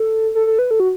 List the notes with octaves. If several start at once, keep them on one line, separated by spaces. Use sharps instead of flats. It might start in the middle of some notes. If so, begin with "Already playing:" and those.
Already playing: A4
A4
A4
B4
A4
F#4